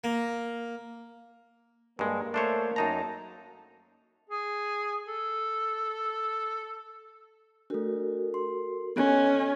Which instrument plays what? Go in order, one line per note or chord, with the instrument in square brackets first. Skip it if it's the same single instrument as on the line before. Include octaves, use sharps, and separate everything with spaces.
[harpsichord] A#3
[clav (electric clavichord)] G2 G#3 [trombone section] A#3 A#4
[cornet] A3 [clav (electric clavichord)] D4 C5 C#5
[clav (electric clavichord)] F#2 D#4 A#5 [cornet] A5
[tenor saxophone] G#4
A4
[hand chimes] A3 D4 [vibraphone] F#4 A4 A#4
[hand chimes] C6
[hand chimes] B3 F#6 [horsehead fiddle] C#4 [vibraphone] A4 D#5 G#5